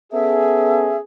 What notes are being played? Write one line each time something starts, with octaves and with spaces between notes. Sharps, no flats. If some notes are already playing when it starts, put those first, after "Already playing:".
B3 C#4 G#4 A4 E5